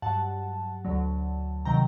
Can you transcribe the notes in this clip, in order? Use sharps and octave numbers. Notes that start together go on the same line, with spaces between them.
G2 F#3 F#5 A5
D2 D3 F#3
C3 D#3 F#3 G5 A#5